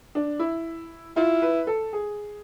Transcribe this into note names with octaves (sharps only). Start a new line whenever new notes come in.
D4
E4
E4 F4
B4
A4
G#4